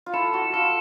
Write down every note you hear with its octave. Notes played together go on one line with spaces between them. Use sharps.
F4
E4 A4
F#4
F4 A4